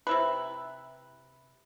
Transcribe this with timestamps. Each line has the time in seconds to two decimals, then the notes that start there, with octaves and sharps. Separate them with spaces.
0.07 C3 E4 B4